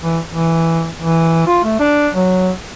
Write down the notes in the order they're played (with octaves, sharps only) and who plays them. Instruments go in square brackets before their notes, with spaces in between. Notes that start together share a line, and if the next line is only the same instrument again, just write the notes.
[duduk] E3
E3
E3
F4
A3
D4
F#3